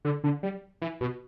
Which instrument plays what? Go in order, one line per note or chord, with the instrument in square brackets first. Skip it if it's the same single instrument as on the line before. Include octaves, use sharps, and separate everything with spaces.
[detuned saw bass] D3
D3
G3
E3
B2